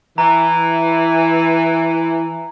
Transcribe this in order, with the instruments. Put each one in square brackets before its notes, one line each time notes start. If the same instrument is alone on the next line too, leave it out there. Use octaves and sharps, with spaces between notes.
[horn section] E3 [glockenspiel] A#5